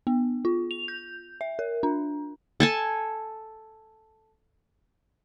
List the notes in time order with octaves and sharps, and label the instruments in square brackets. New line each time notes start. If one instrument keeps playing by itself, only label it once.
[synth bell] B3
F4
F7
G6
E5
A#4
D4
[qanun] A4 G#5 A5